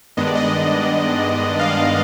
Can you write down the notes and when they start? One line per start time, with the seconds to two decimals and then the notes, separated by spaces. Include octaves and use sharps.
0.17 G2 D#3 G#3 B3 D4 D#5
0.27 D5
0.35 D#5
1.59 F5